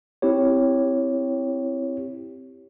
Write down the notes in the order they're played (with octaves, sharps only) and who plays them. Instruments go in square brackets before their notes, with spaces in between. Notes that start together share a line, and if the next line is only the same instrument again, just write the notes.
[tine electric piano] C4 E4 G4 C#5